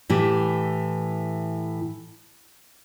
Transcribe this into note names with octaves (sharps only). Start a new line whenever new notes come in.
A2 E3 G4